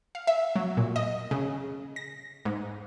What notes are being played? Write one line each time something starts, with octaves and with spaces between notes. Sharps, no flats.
F5
E5
F#3
A#2
D#5
C#3
A#6
G#2